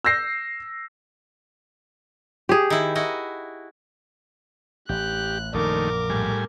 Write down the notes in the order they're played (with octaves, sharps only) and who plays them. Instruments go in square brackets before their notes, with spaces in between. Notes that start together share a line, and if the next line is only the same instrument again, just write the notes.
[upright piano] E6 G6 A#6 C7
[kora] G4 G#4
[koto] D#3 E4
E4 F#4 D#5
[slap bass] A1 [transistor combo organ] G4 [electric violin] F#6
[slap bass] A#1 F#2 [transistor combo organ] D#3 A3 [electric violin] A#4 D6
[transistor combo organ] A2 G3 G#5